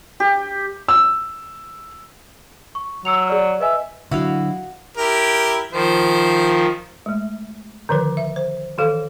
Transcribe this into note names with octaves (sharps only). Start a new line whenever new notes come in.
G4
E6
C#6
F#3 E6 C#7 F7
G#4 D5 F6
B4 D#5 E5 G#5
D3 D#3 F#3 E4 F#4 D#5 F5
E4 G4 A#4
D#3 F3 C5
G#3 A3
D3 D#3 F3 B4
E5
C5
D#3 E3 A4 F5